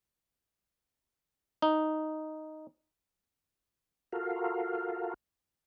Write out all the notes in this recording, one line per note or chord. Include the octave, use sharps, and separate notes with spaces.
D#4
F4 F#4 A4 A#4 F5